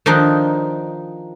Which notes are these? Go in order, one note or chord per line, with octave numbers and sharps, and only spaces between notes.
D#3 F3 D4 D#4